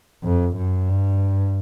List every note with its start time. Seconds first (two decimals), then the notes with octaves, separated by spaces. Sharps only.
0.23 F2
0.57 F#2
0.89 G2